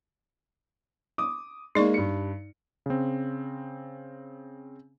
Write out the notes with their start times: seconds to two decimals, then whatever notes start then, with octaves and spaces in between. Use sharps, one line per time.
1.18 D6 D#6
1.75 G#3 A#3 D#4 D5 C#6
1.94 G2 C#7
2.86 C#3 C4